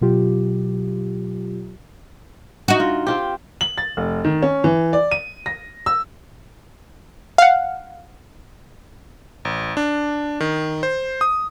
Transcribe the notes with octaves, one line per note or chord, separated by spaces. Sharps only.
B2 F#3 F4 G4
D#4 F#4
F4
C4 F4 G4
F#7
A6
F1
D#3
C#4
E3
D5
D#7
A#6
E6
F5 F#5
A1
D4
D#3
C5
D#6